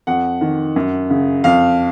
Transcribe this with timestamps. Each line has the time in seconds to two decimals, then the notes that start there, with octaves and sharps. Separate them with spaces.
0.07 F2 F#5
0.41 D#3
0.76 F#2
1.10 C#3
1.44 F2 F5